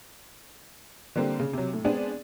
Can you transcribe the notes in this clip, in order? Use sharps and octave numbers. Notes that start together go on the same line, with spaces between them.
D3 G3 A#3 C4
C#3
C3 F#3
A2
G#3 B3 C4 D4 G#4